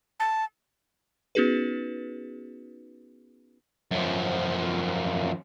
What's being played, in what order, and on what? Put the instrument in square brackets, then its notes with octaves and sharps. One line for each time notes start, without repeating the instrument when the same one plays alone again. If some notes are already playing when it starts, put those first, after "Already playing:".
[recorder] A5
[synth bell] B3 C#4 D#4 F#4 G#4 B4
[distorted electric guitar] F#2 F3